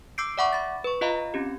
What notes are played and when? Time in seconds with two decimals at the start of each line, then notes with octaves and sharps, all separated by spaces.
0.18 D6 E6 G6 C7 D7
0.38 D5 E5 F#5 B5 C#6 D6
0.53 B5 A6
0.84 B4 C#6
1.01 F4 D#5 F5 A#5 B5
1.34 C4 C#4 G4